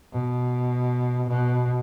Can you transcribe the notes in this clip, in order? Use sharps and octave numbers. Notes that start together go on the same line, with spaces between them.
B2
B2